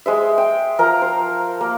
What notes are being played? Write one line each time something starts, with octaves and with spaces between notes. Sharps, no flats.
G#3 C5 E5
G5
F3 A#4 A#5
C5
A#3